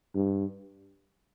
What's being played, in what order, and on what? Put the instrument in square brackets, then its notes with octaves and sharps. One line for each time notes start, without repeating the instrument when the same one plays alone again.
[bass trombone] G2